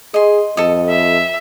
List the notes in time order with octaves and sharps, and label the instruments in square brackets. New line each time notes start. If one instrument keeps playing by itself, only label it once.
[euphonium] G#4 [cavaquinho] D#5 C6
[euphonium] F2 [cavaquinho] A4 D#5
[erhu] E5